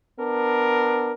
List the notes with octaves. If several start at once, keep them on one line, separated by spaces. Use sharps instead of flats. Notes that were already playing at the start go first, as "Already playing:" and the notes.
B3 D4 A#4